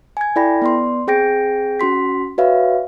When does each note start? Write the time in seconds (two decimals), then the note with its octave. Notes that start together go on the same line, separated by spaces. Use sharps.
0.17 G#5 G#6
0.36 E4 A4 D5 G5 B5 A#6
0.62 B3 D5 C6
1.07 C4 G#4 G5 G6 A#6 D7
1.80 C#4 F#4 C6 B6
2.38 F#4 B4 C#5 E5 F5